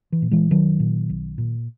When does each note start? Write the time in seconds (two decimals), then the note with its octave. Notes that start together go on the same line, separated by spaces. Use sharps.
0.12 E3
0.22 A#2
0.31 E3 G#3
0.51 B1 D#3 F#3
0.80 A#2
1.09 B1
1.38 A#2